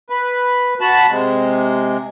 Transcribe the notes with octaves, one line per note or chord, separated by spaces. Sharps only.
B4
F#4 A5 B5
C3 G#3